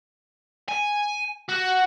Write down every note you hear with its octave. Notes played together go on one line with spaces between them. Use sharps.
G#5
F#4